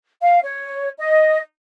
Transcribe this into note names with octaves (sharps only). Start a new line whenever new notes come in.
F5
C#5
D#5